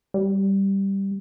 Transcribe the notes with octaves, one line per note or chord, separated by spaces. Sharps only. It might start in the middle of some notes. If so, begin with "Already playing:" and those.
G3